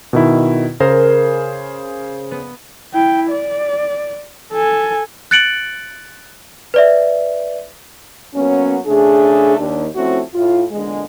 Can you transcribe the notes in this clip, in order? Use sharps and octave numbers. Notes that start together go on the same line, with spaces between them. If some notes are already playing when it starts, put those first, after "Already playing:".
B2 D#3 E4
C#3 G#4 A#4 C5
B3
E4 G5
D5
A4 G#5
F#6 A6 C#7 D7 F#7
B4 D5 E5
F#3 A#3 B3 C#4
C#3 A3 D4 G#4
D#2 D4
F3 A3 C4 C#4 E4 F#4
A2 F4
E2 A#2 D3 G#3